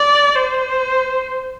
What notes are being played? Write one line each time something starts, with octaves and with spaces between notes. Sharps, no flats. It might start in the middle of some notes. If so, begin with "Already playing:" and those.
Already playing: D5
C5